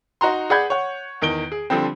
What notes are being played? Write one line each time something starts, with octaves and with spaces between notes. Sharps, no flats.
D#4 F#4 A#5 C6
G#4 D5 F#5 B5 G6 G#6
C#5 F#5
E2 D#3 D7 G7
G#4
D3 F3 G3 C4